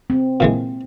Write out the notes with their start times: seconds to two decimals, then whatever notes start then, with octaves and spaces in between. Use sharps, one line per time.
0.10 C4
0.40 A#2 E3 G#3